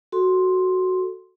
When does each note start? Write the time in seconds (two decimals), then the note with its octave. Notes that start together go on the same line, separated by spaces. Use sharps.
0.12 F#4 A4 C6